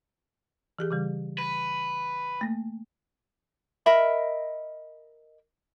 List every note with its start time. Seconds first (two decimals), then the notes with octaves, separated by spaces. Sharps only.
0.79 E3 G4 G#4
0.91 C#3 E3 G3
1.38 B4
2.41 A3 A#3
3.86 A#4 D#5 E5 B5